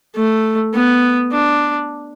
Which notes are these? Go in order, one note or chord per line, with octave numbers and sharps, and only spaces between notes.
A3
B3
D4